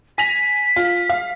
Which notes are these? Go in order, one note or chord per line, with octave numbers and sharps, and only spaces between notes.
G#5 A#6 B6 F7
F4
F5